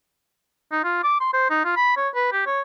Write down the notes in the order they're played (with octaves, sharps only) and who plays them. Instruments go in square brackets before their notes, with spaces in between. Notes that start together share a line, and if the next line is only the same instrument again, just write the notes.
[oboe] D#4
F4
D6
C6
C5
D#4
F4
B5
C#5
B4
G4
C#5